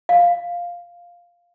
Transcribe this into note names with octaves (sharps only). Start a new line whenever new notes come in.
F5